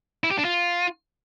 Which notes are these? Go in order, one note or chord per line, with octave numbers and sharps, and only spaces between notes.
E4
G4
D4
F4